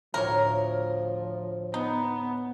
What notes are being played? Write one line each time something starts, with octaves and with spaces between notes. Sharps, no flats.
D2 A2 F3 A#4 C#5
B3 D#4